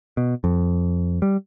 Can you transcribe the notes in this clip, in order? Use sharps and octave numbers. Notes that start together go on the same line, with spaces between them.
B2
F2
G3